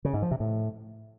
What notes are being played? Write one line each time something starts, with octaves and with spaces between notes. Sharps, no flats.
C#3
G#2
F3
C3
A2